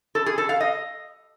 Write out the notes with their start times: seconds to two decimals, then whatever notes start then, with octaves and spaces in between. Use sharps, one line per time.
0.15 A4
0.26 G#4
0.38 A4
0.49 F5
0.60 D#5